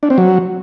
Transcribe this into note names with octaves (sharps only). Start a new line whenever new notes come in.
D4
C4
F#3